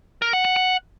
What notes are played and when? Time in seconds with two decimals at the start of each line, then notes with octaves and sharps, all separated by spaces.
0.22 A#4
0.33 F#5
0.45 F#5
0.56 F#5